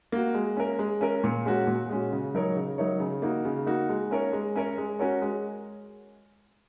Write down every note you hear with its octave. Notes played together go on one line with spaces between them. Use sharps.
A#3 F#4
G#3
C#4 A#4
G#3
C#4 A#4
A#2
G#3 C#4 F#4
A#2
G#3 C#4 F#4
C#3
F#3 D#4 A#4 C#5
C#3
F#3 D#4 A#4 C#5
C#3
A#3 D#4 F#4
C#3
A#3 D#4 F#4
G#3
C#4 A#4 C#5
G#3
C#4 A#4 C#5
G#3
C#4 F#4 A#4 C#5
G#3